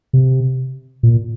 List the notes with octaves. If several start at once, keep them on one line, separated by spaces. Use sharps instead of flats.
C3
A#2